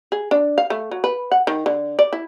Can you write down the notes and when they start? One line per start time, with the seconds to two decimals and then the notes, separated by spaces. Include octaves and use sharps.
0.12 G#4
0.31 D4
0.58 F5
0.70 A3
0.91 F#3
1.04 B4
1.32 F#5
1.47 D#3
1.66 D3
1.99 D5
2.13 E4